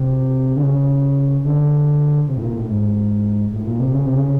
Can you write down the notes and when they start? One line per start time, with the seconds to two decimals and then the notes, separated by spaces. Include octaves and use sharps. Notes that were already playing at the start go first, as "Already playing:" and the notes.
Already playing: C3
0.56 D3
0.62 C#3
1.45 D3
2.27 C3
2.37 A2
2.42 A#2
2.56 A2
2.69 G#2
3.53 A2
3.66 A#2
3.80 C3
3.94 C#3
4.06 C3
4.17 C#3